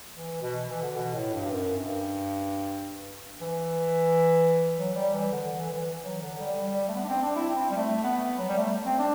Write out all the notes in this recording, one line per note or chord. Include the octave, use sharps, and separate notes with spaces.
E3
B2
E3
D3
B2
A2
G2
F#2
G2
E3
F#3
G3
E3
D3
E3
E3
E3
F#3
D3
G3
G3
A3
B3
D4
C4
D4
E4
C4
G3
A3
B3
F#3
G3
A3
C4
D4